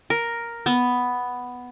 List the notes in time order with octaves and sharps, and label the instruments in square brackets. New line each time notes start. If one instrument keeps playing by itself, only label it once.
[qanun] A#4
B3